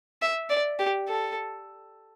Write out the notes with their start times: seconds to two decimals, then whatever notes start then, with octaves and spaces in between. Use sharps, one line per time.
0.22 E5
0.50 D5
0.79 G4
1.08 A4